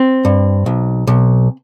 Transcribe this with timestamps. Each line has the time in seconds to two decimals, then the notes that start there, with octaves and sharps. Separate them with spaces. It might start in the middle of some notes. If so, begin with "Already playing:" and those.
Already playing: C4
0.25 G2
0.66 B1
1.07 B1